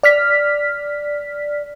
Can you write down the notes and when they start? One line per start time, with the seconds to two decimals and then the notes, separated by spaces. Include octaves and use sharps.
0.03 D5 F6 B6